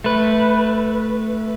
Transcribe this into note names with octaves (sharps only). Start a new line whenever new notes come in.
A3 B4